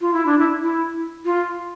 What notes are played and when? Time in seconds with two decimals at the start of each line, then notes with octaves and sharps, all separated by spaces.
0.01 F4
0.13 E4
0.26 D4
0.39 E4
0.63 E4
1.25 F4